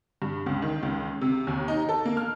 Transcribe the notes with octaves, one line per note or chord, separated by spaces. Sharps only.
G2
C#2
D#3
C#2
C3
D#2
D#4
A4
A#3
F6